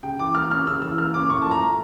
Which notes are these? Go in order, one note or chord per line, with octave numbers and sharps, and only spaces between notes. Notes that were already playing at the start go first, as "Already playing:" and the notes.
C#3 G5
E3 D6
A#3 F6
C#4 F6
C#3 E6
E3 E6
A#3 F6
C#4 D6
A2 C#6
F3 A5
A#5
A3